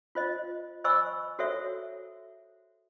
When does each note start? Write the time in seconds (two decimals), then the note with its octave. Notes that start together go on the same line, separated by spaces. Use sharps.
0.15 F4 C5 D#5
0.84 C5 D#5 G#5 B5 C#6 E6
1.39 F#4 G#4 A4 C5 C#5 E5